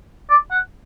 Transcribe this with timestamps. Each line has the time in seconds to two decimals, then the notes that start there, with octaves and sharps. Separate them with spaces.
0.30 D5
0.51 F#5